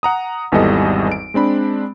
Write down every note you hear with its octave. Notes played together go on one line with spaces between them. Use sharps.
F#5 A#5 D#6
G#1 E2 E3 G3 A4 D#5
D7
G#3 C4 D4 B5